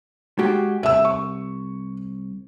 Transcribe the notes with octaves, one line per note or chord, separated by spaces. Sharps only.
G#3 F#4 G4
C2 E5 E6
C#6